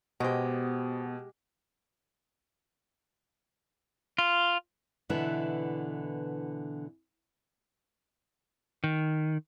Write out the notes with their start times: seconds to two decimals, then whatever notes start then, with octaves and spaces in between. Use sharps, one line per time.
0.20 B2 G#3 B3 F#4 G4 C5
4.18 F4
5.09 B2 D3 E3 B3 E4
8.84 D#3